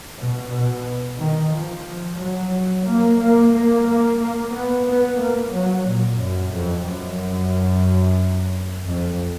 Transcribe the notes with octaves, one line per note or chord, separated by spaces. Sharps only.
B2
B2
D#3
F3
F#3
A#3
A#3
A#3
A#3
A#3
B3
B3
A#3
F#3
A#2
F#2
F2
F#2
F2